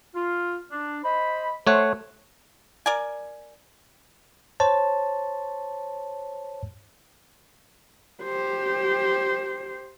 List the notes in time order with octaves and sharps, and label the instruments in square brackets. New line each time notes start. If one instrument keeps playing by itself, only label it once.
[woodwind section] F4
D4
C5 D#5 B5
[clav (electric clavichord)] A3 C#5 F#5 [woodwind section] C5
[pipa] A#4 D5 G#5
[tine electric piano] C5 C#5 A5
[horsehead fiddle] G4 C5